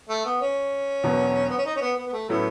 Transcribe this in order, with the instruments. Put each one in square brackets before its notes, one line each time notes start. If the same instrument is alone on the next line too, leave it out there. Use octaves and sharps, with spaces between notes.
[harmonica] A3
B3
C#4
[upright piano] E1 E2 B2 F#3
[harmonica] B3
C#4
D#4
C#4
B3
B3
B3
A3
[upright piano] A2 F#3 A3 C#4 E4 [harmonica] B3